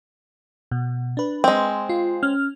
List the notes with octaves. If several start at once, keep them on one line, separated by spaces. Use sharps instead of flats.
B2
D4 B4
G#3 C4
F4
C#4 F6